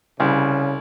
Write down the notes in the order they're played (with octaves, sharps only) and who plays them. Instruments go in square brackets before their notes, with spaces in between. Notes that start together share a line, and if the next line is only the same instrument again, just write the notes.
[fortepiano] C2 [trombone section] C#3